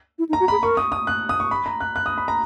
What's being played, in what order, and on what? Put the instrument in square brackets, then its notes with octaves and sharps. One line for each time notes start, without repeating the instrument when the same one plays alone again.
[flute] E4
D#4
[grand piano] A#5
[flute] F#4
[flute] G#4 [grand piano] B5
[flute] A#4 [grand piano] C#6
[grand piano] D#6
D#6
F#6
D#6
C#6
B5
A#5
F#6
F#6
D#6
B5
A#5